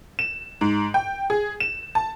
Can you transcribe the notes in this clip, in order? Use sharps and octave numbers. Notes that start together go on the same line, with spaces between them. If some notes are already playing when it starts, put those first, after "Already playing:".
E7
G#2
G5
G#4
E7
A5